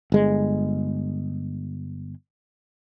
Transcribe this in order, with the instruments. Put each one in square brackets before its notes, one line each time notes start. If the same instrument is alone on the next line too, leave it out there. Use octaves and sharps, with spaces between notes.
[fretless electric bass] G1 G#3